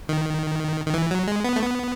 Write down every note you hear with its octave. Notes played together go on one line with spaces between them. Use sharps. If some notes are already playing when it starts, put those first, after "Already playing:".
D#3
D#3
E3
F#3
G#3
B3
A3
B3